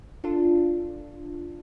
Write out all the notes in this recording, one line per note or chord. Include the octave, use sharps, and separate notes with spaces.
D4 F4 A4